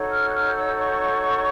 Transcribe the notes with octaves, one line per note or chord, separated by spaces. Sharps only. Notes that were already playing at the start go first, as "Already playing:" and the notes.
Already playing: D#4 F#4 A4 C#5
F6
F#6
F6
E6
C#6